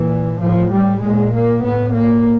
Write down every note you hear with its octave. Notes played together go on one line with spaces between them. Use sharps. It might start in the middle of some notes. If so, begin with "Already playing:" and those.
Already playing: A#2 E3
A2 F3
G3
A#2 G#3
A#3
A2 B3
A#3